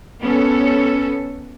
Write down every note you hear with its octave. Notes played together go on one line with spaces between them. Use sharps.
B3 C#4 A4